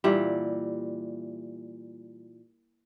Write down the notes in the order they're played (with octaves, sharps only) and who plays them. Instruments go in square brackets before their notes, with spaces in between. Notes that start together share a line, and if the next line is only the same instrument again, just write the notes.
[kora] A#2 E3 G3